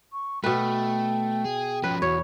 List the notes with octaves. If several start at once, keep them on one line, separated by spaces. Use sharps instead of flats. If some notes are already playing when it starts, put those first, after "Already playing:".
C#6
B2 A3 B4 G5
G#4
F3 C#4 B4
E2 F#4 C#5